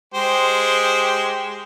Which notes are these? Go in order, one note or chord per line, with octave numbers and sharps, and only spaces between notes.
G#3 G4 C5